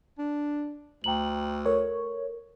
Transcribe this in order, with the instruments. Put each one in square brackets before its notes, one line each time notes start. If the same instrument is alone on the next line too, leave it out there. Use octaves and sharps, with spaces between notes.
[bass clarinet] D4
[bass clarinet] D2 [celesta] G5 A#5 F#7
[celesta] A4 A#4 [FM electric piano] C#5